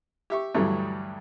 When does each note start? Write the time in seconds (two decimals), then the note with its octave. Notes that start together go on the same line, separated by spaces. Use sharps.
0.30 G4 E5 C#6
0.55 D2 G2 E3 F#3 G3 A3